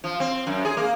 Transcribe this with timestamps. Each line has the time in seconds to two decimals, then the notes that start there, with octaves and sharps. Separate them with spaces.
0.04 F3
0.20 C4
0.47 F#2
0.65 G#4
0.77 A#3